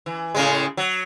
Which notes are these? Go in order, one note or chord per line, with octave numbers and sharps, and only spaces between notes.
E3
A2 C#3 G#3
F#3